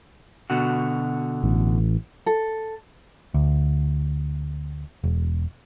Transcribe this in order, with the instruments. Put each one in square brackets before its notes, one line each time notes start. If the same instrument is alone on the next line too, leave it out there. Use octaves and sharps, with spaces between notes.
[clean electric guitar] B2 D3 F#4
[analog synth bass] A1
[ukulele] A4
[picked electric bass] D2
E1